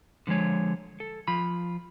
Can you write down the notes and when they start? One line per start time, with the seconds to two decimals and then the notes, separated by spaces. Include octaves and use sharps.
0.27 D3 F3 F#3 G#3 C#5
1.00 A4
1.28 F3 F4 B5